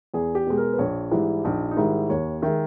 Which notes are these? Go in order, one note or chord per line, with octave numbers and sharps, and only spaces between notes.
E2 G#4
G4
B2 G#3
A#4
B4
A#1 C#5
G#2 E3 G3 E4
A#1 D#4
D#4
G#2 D#3 G3 E4
D#2 C#5
D#3 G#3 E5